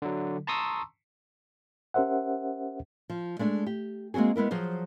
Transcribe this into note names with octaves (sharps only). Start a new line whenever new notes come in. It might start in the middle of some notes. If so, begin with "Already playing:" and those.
D3 F#3
A5 A#5 C6 C#6 D#6 E6
C#4 G4 A#4 C5 E5 F#5
F3
G#3 A3 D4
G4
G#3 A#3 C4 F#4 G#4
G#3 B3 E4 A#4
F3 F#3 G#4 C5